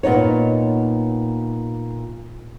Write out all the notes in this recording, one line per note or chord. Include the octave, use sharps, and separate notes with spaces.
A#2 B3 D#4 C#5